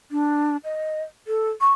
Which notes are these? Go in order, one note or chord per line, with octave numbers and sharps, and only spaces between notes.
D4
D#5
A4
C#6